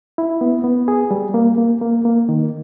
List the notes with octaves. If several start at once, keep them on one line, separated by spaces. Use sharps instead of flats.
E4
B3
B3
G#4
G3
A#3
A#3
A#3
A#3
D#3